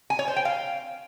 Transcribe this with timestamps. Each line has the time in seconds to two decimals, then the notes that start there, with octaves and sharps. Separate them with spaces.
0.10 G#5
0.19 C#5
0.28 C5
0.36 G5
0.45 F5